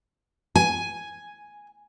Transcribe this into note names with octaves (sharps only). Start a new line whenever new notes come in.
G#5